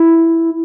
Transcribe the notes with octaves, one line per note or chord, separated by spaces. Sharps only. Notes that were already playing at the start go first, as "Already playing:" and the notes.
Already playing: E4